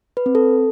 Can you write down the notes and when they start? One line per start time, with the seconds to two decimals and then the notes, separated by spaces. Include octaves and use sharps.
0.17 B4
0.26 C4
0.35 A4